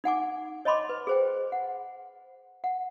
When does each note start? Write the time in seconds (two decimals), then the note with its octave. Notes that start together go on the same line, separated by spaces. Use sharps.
0.04 D#4 F#5 G#5 D6
0.65 C#5 D#5 A5 B5 C6 D6
0.89 B4
1.07 G#4 C5 G5
1.52 F#5
2.64 F#5